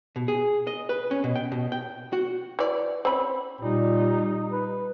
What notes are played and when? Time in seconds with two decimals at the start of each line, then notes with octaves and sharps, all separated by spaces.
0.16 B2
0.28 G#4
0.67 D#5
0.89 B4
1.11 C#4
1.24 B2
1.35 G5
1.52 B2
1.72 G5
2.13 F#4
2.59 E3 D5
3.05 C4 C#4 B5
3.61 A#2 G3 D#4
4.52 B4